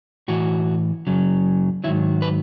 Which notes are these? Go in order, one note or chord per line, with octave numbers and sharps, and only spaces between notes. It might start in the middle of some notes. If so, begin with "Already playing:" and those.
A2 E3 F#4
F#2 C#3 F#3
G#2 D#3 F#3 E4
B4